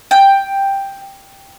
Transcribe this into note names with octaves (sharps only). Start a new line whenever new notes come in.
G5